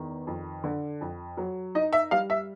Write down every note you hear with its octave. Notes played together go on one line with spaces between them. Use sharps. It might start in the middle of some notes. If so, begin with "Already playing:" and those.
Already playing: E2 D#3
F2
D3
F2
F#3
D#4 D#5
E5
G3 F5
E5